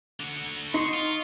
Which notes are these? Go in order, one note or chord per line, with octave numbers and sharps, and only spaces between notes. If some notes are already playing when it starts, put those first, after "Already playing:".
D3 F#4
D#4 C6 C#6
F4